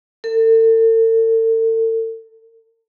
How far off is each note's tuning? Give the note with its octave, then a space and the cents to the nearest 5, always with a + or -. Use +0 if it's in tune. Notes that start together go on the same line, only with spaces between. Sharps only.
A4 +40